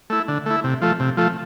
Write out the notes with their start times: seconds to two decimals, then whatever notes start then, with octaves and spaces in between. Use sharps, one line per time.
0.10 A3 E4
0.28 D3
0.46 A3 E4
0.64 C3
0.81 F3 A3
1.00 C3
1.17 F3 A3